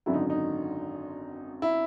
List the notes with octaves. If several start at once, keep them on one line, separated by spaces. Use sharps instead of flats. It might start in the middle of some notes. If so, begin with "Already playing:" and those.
G#1 F#2 D3 F#3 E4
D#4
D#4
E4